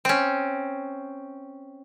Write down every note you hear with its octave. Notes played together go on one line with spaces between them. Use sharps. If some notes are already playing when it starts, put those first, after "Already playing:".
C4 C#4